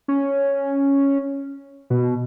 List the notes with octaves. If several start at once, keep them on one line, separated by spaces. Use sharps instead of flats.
C#4
B2